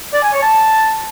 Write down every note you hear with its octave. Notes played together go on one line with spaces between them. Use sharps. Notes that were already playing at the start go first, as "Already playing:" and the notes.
D5
G#5
C#5
A5